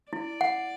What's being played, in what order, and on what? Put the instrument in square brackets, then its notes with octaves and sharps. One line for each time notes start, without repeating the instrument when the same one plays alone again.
[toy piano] E4 [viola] D5
[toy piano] F#5